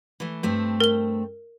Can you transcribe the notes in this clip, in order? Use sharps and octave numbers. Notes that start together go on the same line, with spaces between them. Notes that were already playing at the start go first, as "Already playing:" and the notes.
E3 A3
G2 A3 C4
A#4 G7